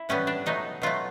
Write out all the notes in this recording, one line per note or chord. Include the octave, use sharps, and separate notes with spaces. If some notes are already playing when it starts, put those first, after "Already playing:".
Already playing: E4
A2 E3 G3 B3 C#4
D4
B2 F#3 A3 D#4
B2 F#3 A3 F4